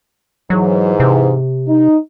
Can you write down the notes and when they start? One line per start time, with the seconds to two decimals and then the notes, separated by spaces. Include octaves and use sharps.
0.50 G#2 E3 F#3
1.00 C3
1.67 D#4